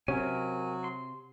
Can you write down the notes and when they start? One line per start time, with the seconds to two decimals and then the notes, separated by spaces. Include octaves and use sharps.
0.08 C3 F#3 C#4 A#4 C#5 G#5
0.84 C6